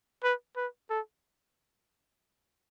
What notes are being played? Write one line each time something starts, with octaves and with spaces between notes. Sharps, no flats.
B4
B4
A4